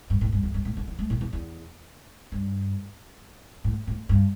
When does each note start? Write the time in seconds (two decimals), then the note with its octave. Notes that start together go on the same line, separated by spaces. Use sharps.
0.10 G2
0.21 A2
0.32 G2
0.43 E2
0.54 G2
0.65 A2
0.77 D3
0.88 E3
0.99 A3
1.10 A2
1.21 E2
1.33 E2
2.32 G2
3.64 A2
3.87 A2
4.09 G2